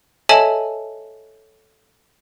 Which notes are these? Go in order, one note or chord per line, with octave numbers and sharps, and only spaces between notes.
A4 C#5 D#5 E5 G#5 A5